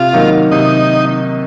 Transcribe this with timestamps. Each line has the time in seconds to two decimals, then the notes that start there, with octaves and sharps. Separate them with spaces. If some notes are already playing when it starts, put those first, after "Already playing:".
Already playing: C3 F4
0.13 D#3 F#3 A#3 D#4
0.51 C3 D#4